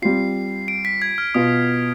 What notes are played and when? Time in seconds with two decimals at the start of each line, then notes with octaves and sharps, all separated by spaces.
0.02 G3 C4 F4 C7
0.68 D7
0.85 B6
1.02 G#6
1.18 F6
1.34 B2 B3 F4 D#6